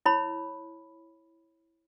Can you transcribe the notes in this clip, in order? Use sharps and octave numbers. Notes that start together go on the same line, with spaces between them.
E4 C#5 B5